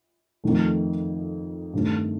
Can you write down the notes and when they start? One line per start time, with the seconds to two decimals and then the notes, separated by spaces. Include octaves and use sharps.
0.44 F2 D#3 A3
1.73 G2 D#3 A3 C4